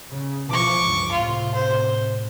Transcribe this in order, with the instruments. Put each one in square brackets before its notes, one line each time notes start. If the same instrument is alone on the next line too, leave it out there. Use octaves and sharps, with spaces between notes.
[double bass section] C#3
[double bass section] B2 E3 F3 [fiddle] C#6 D6
[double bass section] C#2 G2
[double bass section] A2 C3 [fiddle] F4
[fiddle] C5